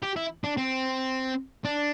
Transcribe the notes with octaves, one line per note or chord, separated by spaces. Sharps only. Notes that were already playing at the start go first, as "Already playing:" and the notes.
G4
E4
D4
C4
D4